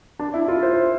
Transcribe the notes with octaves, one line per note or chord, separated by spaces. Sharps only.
D4
E4
F4
C5